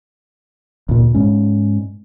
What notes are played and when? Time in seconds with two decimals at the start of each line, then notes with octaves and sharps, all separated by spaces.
0.89 D2 A#2
1.14 G#2 G#3 C#4